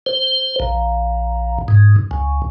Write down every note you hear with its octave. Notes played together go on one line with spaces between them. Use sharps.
C5
A#1
G#2
C#2